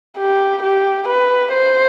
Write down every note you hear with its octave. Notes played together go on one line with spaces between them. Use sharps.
G4
G4
B4
C5